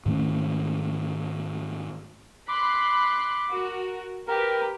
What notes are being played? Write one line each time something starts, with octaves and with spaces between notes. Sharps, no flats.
G#2 D#3 A3 C#4
B5 C6 D6 F#6
F#4 A#4
G4 A#4 B4